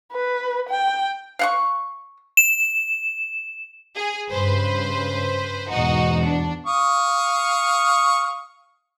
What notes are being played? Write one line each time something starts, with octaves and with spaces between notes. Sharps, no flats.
B4
G5
F5 F#5 C#6
E7
G#4
G2 C#3 B4 C5
E2 G#2 B2 D#4 F#4
D4
F5 C#6 D#6